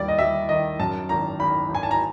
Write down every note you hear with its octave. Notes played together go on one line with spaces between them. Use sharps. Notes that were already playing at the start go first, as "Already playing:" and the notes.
Already playing: D#2 G3 D5
D#5
G3 E5
D#3 D#5
F#2 A5
G#1 A#5
G#1 B5
G#1
G#5
A5
A#5